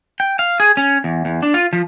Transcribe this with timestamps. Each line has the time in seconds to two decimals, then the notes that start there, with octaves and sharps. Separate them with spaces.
0.20 G5
0.39 F5
0.60 G#4
0.77 C#4
1.04 E2
1.25 E2
1.43 D4
1.54 F4
1.73 F3